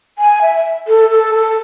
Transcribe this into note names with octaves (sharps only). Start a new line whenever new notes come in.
G#5
E5
A4
A4
A4